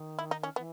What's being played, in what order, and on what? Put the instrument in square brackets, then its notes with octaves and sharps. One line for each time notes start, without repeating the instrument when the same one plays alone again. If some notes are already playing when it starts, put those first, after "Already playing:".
Already playing: [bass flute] D#3
[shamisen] E4
D#4
C#4
[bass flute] E3 [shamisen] B3